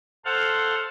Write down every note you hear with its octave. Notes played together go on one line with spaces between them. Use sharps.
A4 C5 F5 F#5